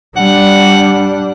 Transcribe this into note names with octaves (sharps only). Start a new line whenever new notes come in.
G3 D4 F#5